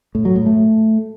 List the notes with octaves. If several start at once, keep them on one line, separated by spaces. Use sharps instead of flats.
A2
F#3
A2
A3